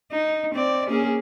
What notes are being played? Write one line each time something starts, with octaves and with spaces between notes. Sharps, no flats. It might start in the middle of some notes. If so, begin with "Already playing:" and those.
D#4
C4 D5
A#3 C#4 G#4